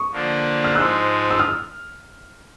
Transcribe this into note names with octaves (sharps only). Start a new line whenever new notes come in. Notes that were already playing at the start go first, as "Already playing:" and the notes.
Already playing: C#6 D#6
D3 F3 A#3 D4
F6
G#2 F3 G#3 E6 F#6
E6
D#6 F6